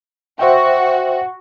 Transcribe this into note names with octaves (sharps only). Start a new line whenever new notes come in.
F#4 C5 E5 G5